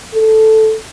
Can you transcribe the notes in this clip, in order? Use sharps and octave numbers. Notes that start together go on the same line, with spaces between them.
A4